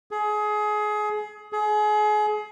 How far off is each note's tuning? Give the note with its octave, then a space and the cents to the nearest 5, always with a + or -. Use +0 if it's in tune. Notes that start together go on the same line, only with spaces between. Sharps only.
G#4 +25
G#4 +30